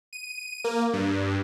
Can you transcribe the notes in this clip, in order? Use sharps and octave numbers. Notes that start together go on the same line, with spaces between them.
D#7
A#3
G2